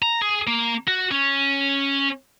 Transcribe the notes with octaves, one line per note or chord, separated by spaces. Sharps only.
A#5
G#4
A#3
F#4
C#4